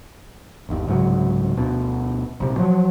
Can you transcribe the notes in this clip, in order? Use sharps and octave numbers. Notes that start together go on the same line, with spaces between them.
G1 D#2
C2 G#2 C#3 F#3
D2 B2
A#1 C3
F3 F#3